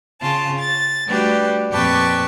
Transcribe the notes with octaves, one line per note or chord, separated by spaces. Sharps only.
C#3 F4 A5
A6
G3 A3 D4 F#4 G4 B4
F2 A#2 G4 B4 A5 C#6